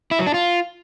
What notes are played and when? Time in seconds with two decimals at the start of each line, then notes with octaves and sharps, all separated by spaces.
0.11 E4
0.19 F#3
0.27 D4
0.34 F4